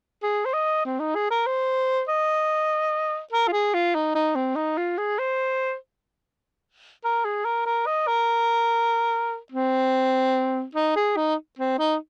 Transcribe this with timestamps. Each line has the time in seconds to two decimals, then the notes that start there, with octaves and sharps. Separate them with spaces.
0.23 G#4
0.45 C5
0.53 D#5
0.85 C4
1.00 D#4
1.15 G#4
1.31 A#4
1.47 C5
2.08 D#5
3.33 A#4
3.48 F4
3.53 G#4
3.74 F4
3.95 D#4
4.15 D#4
4.35 C4
4.56 D#4
4.78 F4
4.98 G#4
5.19 C5
7.04 A#4
7.25 G#4
7.45 A#4
7.66 A#4
7.87 D#5
8.07 A#4
9.52 C4
10.75 D#4
10.96 G#4
11.16 D#4
11.59 C4
11.79 D#4